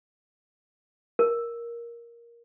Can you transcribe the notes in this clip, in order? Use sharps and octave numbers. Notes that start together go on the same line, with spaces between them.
A#4